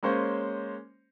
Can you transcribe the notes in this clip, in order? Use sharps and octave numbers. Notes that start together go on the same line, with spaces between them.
G#3 A#3 C#4 C5 C#5